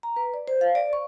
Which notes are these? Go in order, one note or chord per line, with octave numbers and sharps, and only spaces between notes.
A#5
B4
D5
C5
F5
D5
C#6